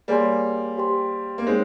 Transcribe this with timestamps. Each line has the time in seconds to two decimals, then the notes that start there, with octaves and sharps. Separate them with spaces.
0.08 G3 A#3 G#4 C#5 G#5 C6
0.78 G4 C5 G5 C6
1.38 A#3
1.46 G#3 C4 D#4 G#4 C#5